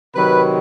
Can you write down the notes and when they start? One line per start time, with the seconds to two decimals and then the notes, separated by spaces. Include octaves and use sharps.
0.15 C3 D#3 F#3 B4